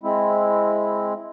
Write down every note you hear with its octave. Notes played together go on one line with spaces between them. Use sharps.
G#3 C4 E4